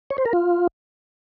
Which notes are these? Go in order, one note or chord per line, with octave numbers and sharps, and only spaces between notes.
C#5
C5
A#4
F4